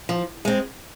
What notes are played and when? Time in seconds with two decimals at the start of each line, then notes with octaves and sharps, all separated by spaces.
0.09 F3
0.45 G#3 C4